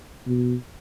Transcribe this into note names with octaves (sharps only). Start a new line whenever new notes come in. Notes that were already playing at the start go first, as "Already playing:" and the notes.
B2